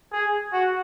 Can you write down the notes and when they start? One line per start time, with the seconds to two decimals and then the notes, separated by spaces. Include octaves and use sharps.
0.13 G#4
0.53 F#4